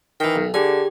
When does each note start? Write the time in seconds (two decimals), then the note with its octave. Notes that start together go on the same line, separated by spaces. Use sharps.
0.20 D#3 E3 G5
0.36 B1
0.54 D3 G4 G#4 G#5